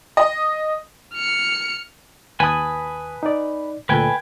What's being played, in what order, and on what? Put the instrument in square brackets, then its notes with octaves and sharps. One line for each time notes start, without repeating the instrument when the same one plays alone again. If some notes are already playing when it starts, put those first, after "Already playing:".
[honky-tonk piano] D#5
[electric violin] F6 C#7
[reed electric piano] D#2 A5 D#6 [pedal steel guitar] B4 G#5
[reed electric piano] D#4 D5
[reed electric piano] D2 A#2 A4 [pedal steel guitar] B4 G5 G#5